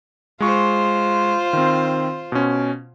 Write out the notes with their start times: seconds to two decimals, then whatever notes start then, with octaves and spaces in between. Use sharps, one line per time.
0.40 G#3 F4 C5 C#6
1.53 D#3 C4
2.32 B2 C#4